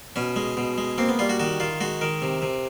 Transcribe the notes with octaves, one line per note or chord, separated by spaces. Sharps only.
B2 C#4
G#3
B2
G#3
A#3 C4
B3
G3 F4
F#4
D#3 F#4
D#3 F4
G#3 F#4
D#3 A#4
C3
C3